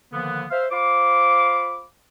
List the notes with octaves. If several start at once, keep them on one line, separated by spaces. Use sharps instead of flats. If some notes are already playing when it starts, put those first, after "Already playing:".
D3 D#3 F3 A#3 B3
C5 E5 F5
F4 C5 F5 B5 D6